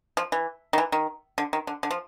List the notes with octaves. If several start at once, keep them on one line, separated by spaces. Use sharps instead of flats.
F3
E3
D#3
E3
D#3
D3
D#3
D3
D3
F3